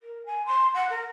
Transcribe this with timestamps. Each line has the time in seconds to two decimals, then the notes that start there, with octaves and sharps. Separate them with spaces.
0.01 A#4
0.25 G#5
0.45 C6
0.74 F#5
0.89 A#4